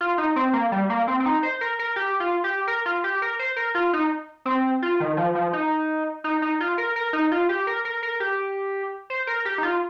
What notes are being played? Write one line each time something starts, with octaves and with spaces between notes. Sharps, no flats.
F4
D#4
C4
A#3
G3
A#3
C4
C4
D#4
C5
A#4
A#4
G4
F4
G4
A#4
F4
G4
A#4
C5
A#4
F4
D#4
C4
F4
D#3
F3
F3
D#4
D#4
D#4
F4
A#4
A#4
D#4
F4
G4
A#4
A#4
A#4
G4
C5
A#4
G4
D#4
F4